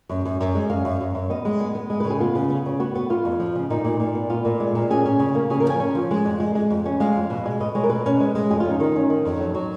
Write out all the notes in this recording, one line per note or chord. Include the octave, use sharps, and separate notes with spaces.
F#2
F#2
F#2
G#3
F#2 F5
F#2
F#2
F#2
B3 D#5
G#3
B3
B3
G#3
C#3 B4
G#4
B3 F4
C#3
B3
C#3
B3 F#4
B3
B3 F4
F2
F3
C#3
A#2 D#4
A#2
A#2
B3
B3 F4
A#2
G#3
A#2
C#4 G#4
C#4
C#3
A#3
C#3 G#4
A#4
F3 G#5
C#4
F3
G#3
F2
G#3
G#3
F2
C#4
G#3 F5
F2
B2
G#3
B2 D#5
G#3 C#5
A#4
B2 B4
C#4
G#3
G#3
F2 G#4
F4
C#4 D#4
D#3 D#4
C#4
D#3
F2
F#3
F#3